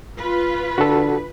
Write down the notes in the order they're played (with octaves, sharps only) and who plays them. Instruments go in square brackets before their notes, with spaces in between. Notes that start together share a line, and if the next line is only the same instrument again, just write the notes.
[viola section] F4 [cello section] B4
[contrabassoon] D3 [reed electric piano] F#4 A4